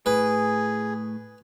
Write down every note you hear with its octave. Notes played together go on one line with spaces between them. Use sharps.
A2 G#4 B4